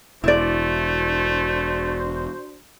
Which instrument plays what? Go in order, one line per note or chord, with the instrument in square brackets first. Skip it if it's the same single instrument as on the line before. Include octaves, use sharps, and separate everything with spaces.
[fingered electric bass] E1 [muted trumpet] A3 [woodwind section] D4 F#4 C5 [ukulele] E4 D5